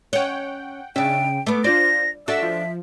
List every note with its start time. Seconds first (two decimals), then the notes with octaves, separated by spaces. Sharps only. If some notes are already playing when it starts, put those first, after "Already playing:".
0.13 C#4 C#5 F#5 G5
0.96 C#3 D4 E5 G5
1.46 A3 B3 D6
1.64 D4 F4 C5 D5 A#6
2.28 D4 F#4 A4 E5 E6
2.42 F3